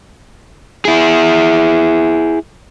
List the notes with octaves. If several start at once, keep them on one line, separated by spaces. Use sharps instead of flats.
E4 G#4